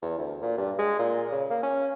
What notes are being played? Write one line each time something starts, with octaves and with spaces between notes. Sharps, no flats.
E2
D2
A#2
G2
G#3
A#2
C#3
A#3
C#4